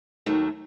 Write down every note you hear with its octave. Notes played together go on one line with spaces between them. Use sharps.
D#2 D#3 F#3 A3